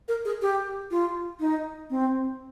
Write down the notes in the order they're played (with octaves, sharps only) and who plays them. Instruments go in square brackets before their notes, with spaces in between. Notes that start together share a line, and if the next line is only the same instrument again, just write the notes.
[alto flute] A#4
G#4
G4
F4
D#4
C4